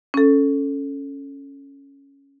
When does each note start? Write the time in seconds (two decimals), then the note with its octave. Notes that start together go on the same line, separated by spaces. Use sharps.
0.14 C#4 A4